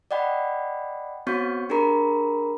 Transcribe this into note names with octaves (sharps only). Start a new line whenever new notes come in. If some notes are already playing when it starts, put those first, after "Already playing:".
D5 D#5 F#5 G5 B5
B3 C4 F#4 C#5 C#6 G6
D4 G4 G#4 A#4 A#5 B5